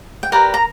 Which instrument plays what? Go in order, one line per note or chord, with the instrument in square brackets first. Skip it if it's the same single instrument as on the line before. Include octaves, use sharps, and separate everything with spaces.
[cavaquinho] G5
G4 A#4 B4 D5 A#5
A#5